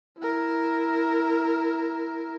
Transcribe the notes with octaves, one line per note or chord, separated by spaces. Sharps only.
E4 A#4